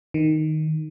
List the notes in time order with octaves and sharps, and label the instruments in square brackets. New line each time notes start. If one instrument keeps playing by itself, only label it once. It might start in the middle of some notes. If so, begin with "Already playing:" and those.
[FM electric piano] D#3